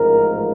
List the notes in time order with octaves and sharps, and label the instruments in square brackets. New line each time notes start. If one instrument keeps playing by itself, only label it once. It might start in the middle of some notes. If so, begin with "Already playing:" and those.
Already playing: [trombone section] A1 G#2 F3 A#4